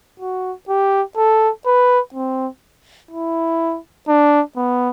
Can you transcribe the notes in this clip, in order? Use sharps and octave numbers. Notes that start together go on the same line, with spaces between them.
F#4
G4
A4
B4
C4
E4
D4
B3